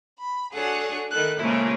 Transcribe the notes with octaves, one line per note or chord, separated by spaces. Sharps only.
B5
D4 F#4 G#4 A4 C#5 F#5
D#3 E4 A4 F#6
A#2 C#3 F3 G#3 A3 E4